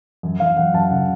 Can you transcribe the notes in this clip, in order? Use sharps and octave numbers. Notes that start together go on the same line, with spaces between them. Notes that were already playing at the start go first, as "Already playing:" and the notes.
F#2
F#2 F5
F#2 F#5
F#2 A5
C#3 F#5